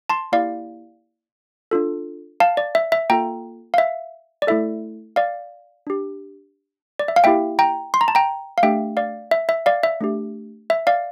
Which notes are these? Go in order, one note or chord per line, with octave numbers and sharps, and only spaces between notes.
A5 C6
A#3 E4 G4 D5 F5
D4 F4 A4
F5 A5
D5
E5
E5
A#3 F4 A4 G5 A#5
F5
E5
D5
A3 E4 A4 E5
D5 F5
D4 G4
D5
E5
F5
A#3 E4 G4 E5 G5
G5 A#5
C6
A#5
A5
G5 A#5
F5
A3 D4 G4 E5 G5
D5 F5
E5
E5
D5 F5
E5
A3 D4 G4
E5
D5 F5